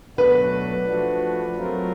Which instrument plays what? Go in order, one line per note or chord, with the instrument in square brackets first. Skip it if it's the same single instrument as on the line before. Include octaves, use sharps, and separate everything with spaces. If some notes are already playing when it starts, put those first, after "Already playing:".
[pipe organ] B2 F#3 A3 D4 F#4 [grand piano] B4
[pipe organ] F3 A3 D4 F#4
F#3 A3 C4 F4 A#4